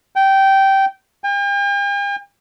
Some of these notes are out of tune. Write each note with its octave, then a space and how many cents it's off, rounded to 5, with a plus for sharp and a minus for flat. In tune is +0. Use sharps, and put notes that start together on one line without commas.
G5 -15
G5 +45